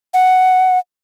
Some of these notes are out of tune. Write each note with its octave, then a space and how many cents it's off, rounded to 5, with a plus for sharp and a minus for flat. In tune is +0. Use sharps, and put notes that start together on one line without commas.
F#5 +5